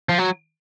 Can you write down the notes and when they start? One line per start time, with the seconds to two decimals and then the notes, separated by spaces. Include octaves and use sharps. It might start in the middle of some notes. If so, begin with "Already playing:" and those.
0.09 F3
0.18 F#3